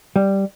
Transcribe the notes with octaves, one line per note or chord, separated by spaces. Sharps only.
G3